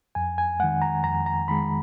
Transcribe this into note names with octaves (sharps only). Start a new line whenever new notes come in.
F2 G#5
G#5
D#3 G#3 F#5
A#5
F2 A#5
A#5
D#3 G#3 B5